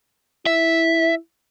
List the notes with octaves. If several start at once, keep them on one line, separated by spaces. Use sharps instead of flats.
E4 E5